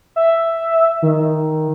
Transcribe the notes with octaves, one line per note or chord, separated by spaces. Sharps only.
E5
D#3